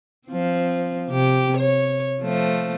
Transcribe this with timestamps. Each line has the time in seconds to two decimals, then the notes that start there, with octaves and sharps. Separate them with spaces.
0.28 F3 C4
1.09 C3 G4
1.58 C#5
2.21 F3 A3